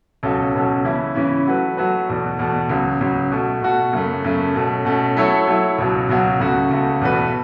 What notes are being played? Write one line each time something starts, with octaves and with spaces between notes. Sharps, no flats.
C#2 B2 F#3 C#4 A4
C#2 B2 F#3 C#4 A4
C#3 E3 C#4 E4
C#3 E3 C#4 E4
F#3 A3 F#4 B4
F#3 A3 F#4 B4
E2 B2 A3
E2 B2 A3
C#2 C#3 F#3
C#2 C#3 F#3
B2 A3 F#4
B2 A3 F#4
F#2 C#3 A3
F#2 C#3 A3
B2 A3 C#4
B2 A3 C#4
F#3 A3 E4 A4 C#5
F#3 A3 E4 A4 C#5
C#2 B2 F#3
C#2 B2 F#3
C#2 C#3 A3 F#4
C#2 C#3 A3 F#4
E2 B2 A3 F#4 B4